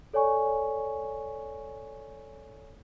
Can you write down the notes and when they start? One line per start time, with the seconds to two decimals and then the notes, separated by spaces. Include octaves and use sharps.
0.13 A4 C#5 D5 G#5 C#6